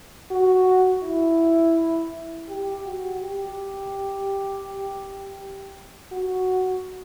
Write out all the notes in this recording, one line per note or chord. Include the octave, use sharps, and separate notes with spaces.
F#4
E4
G4
F#4
G4
F#4